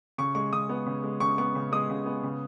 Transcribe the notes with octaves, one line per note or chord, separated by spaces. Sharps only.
C#3 C#6
G#3 C#6
C#3 D#6
B3
C#3
G#3
C#3 C#6
B3 C#6
C#3
G#3 D#6
C#3
B3
C#3